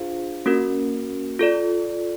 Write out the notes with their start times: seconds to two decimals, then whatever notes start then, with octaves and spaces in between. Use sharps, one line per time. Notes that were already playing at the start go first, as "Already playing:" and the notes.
Already playing: D4 F4 G#4 C5 F5
0.46 A#3 C#4 F#4 A#4
1.39 F4 A4 D5